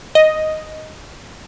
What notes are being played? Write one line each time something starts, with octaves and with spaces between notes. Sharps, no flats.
D#5